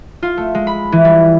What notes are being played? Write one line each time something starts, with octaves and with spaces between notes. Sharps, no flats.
F4
A3
G#3
B5
E3
G3